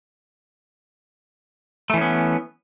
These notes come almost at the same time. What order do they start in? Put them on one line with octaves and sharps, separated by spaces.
A3 E3 C#4 B3